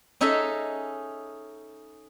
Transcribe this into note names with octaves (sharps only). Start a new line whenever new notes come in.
C#4 D#4 G#4 A4 E5 A#5